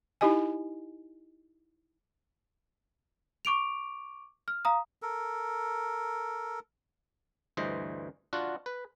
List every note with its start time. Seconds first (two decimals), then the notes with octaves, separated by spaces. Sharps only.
0.21 D#4 E4 G4 D#5 G#5
3.45 C#6 D6 D7 F7
4.48 F6
4.65 F5 A#5 D#6
5.02 A4 A#4
7.57 D2 G2 E3 C5 D#5
8.33 D4 F4 F#4 F#5
8.66 B4